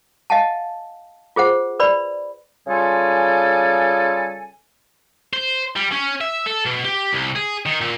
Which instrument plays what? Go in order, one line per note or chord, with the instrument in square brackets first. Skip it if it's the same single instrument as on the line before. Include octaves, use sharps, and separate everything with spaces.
[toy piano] D#5 F5 F#5 G#5 A5
F4 G#4 C5 F#5
B4 D5 B5
[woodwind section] C#3 G3 F4 A4 G#5
[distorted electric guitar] C5
G3
C#4
E5
A4
B2
G4
C2
G#4
D#3
A#2